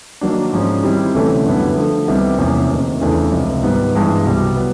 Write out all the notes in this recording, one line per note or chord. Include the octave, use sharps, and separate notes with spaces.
D#3 F#3 A#3 D4
G#2 F3 G#3 C#4
D#3 G3 C4 E4 G4
D2 C3 E3 A3 C#4
F#2 D3 G3 B3 E4
D3 F3 A3
C2 C3 D#3 G3 B3
E2 C3 F3 A#3 C#4
D2 C3 D#3
E2 C#3 E3 A3 D4
C#2 C3 F3
G#2 D#3 G3 B3
G2 E3 G#3 B3
C2 B2 G3
F#3 B3